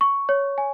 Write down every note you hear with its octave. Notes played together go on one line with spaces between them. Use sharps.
C#6
C#5
G#5